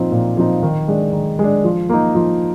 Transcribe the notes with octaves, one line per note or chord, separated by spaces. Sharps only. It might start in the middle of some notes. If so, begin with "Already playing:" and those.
Already playing: A#2 F3 C4 D#4
A#2
F3 C4 D#4
D#3
G#3 D4
D#3
G#3 D4
F3
A#3 D#4
F3